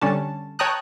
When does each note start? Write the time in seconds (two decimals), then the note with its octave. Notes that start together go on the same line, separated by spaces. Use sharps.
0.01 D3 G3 C#4 D4 A5
0.59 C#5 G5 A5 A#5 D#6 F#6